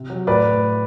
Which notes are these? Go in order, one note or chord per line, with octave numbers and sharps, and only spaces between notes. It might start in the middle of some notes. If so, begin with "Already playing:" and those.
Already playing: C3
F#3
A2 B4 D5